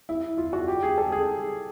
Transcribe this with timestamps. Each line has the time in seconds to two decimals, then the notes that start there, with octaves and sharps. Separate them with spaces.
0.09 E4
0.38 F4
0.53 F#4
0.68 G4
0.83 G#4
0.98 A4
1.12 G#4